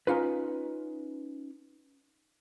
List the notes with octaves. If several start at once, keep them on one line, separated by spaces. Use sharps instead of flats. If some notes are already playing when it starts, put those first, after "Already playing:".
C#4 D#4 F4 B4